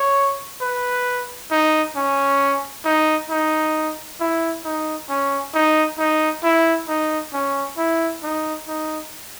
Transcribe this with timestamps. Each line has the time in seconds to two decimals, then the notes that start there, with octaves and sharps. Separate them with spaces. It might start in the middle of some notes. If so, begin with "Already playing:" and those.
Already playing: C#5
0.61 B4
1.51 D#4
1.96 C#4
2.85 D#4
3.30 D#4
4.20 E4
4.64 D#4
5.09 C#4
5.55 D#4
5.99 D#4
6.43 E4
6.88 D#4
7.33 C#4
7.78 E4
8.23 D#4
8.68 D#4